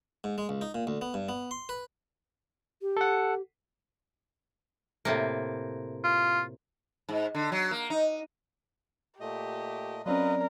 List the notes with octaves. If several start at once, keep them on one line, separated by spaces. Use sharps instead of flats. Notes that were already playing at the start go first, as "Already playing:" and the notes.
G#2
G#3
C#2
D#4
A#2
D2
B3
G2
B3
C6
B4
G4
A4 F#5
A2 C3 A#3
F4
G#2
D3
F#3
A#3
D#4
A#2 A3 G4 D#5
F#3 C4 C#4 F4 A#4 B4 D5 D#5